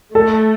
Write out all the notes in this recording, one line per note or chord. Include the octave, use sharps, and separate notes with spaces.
A3 A4